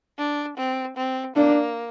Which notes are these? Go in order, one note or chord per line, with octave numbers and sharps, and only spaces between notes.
D4
C4
C4
A#3 D4